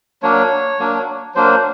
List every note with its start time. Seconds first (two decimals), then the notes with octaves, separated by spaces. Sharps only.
0.23 F#3 A#3 D4 C#5
0.79 F#3 A#3 D4
1.35 F#3 A#3 D4 C5